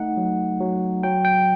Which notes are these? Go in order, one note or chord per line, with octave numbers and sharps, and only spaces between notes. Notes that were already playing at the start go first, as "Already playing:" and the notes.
Already playing: A3 D#4 F#5
F#3
F#3
F#3 G5
G5